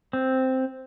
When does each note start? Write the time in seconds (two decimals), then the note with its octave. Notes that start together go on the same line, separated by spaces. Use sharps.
0.13 C4